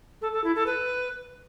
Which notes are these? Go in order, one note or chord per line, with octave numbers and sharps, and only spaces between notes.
A4
A4
E4
A4
B4